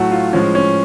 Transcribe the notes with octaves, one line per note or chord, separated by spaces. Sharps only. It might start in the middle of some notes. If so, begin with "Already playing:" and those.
Already playing: A2 F#3 A3 F#4
F4
A2 F3 G#3 C#4
C#4